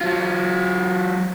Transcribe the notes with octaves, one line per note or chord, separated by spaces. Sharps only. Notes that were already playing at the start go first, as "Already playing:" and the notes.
F#3 F4